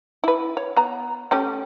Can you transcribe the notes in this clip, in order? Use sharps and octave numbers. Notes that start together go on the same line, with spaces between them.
E4 B4
C#5
B3 A#5
A3 C#4 G4